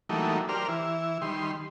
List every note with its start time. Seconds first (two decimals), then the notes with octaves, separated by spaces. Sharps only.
0.09 E3 F#3 G3 A3 A#3 D#4
0.49 G4 A#4 C5 D5 F6
0.68 E3 E4
1.22 D#3 G3 C6